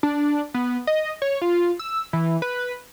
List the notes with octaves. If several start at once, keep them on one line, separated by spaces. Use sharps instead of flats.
D4
B3
D#5
C#5
F4
E6
E3
B4